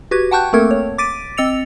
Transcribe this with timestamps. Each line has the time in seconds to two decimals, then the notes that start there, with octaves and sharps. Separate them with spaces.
0.11 F#4 G4 B4 G#6
0.31 F#5 G5 A5 C#6 F#6 G6
0.53 A3 A#3 C4 A4 A#4 G#6
0.71 C#5
0.98 D6 A6 B6 D7 D#7
1.37 C4 D#5 E6 A6 C#7 F7